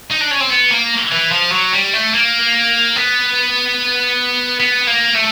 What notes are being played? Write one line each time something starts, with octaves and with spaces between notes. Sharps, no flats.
D#4
D4
C#4
C4
B3
A#3
E3
F3
F#3
G3
A3
A#3
B3
B3
A#3
A3